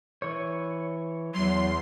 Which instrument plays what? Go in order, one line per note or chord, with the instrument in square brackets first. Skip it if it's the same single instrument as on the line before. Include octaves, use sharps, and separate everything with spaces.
[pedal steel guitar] E3 C#5
[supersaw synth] E2 C6 [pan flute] F#3